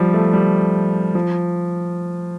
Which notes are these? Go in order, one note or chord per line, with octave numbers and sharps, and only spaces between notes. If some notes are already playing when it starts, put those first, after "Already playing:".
Already playing: F3 G3
A3
G3
F3